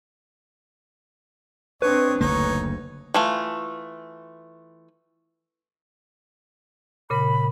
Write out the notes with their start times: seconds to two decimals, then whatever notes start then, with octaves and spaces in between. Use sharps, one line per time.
1.82 C4 D4 B4 C#5 D#5
2.21 F#1 D2 D3 A#3 D#4 C#5
3.14 E3 A3 F4
7.10 A#2 C#3 A#4 B5